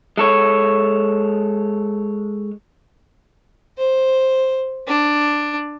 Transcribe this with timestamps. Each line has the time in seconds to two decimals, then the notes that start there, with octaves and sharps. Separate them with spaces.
0.17 G#3 A4 C#5
3.78 C5
4.87 D4